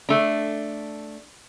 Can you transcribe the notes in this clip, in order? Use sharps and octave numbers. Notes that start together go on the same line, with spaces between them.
A3 D4